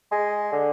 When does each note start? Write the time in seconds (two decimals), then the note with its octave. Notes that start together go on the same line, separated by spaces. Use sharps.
0.12 G#3
0.52 D3